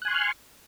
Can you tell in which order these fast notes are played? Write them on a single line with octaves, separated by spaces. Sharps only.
F#6 G#5 C6 C#6 F6